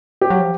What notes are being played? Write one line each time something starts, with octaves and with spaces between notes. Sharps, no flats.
G4
F#3
F3